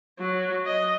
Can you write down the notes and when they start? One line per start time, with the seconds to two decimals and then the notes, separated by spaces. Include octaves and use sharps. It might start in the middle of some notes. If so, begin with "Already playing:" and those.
0.19 F#3
0.66 D#5